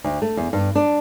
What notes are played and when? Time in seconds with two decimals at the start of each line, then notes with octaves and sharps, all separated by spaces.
0.04 D2
0.22 A3
0.37 E2
0.53 G2
0.75 D4